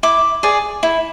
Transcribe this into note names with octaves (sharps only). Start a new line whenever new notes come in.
E4 D6
G#4 D5
E4